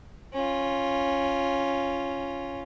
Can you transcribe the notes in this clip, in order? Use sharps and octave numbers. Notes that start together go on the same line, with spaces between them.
C#4 F4